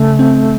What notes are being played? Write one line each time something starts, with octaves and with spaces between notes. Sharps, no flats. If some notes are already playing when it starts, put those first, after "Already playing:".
Already playing: C#3 A3
C4